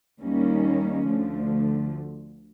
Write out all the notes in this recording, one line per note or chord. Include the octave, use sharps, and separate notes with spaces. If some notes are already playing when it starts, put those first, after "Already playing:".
D#2 D#3 G3 A#3 C#4
D2 D3 F3 A3